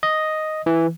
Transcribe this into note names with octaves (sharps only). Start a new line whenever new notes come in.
D#5
E3